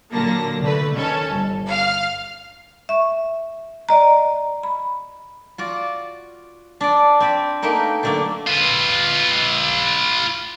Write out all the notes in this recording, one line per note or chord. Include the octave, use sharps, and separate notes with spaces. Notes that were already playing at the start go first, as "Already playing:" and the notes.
A#2 D3 F#3 A#3 A5 A#6
D3 A3 B4
D#3 C#4 A4 A5
G1
F5 F6
E5 C#6
D5 D#5 A#5
B5
F4 F#4 D5
D4 D5
C4 D5 B5
A3 A#3 D#4 A#4 B4 G5
D3 F#3 A3 A#3 D4
F4 B4